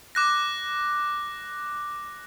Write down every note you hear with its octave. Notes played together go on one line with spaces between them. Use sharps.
D6 F#6 A#6